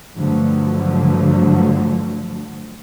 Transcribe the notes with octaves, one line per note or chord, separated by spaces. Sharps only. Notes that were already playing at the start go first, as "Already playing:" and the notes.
G2 D3 F3 F#3 A3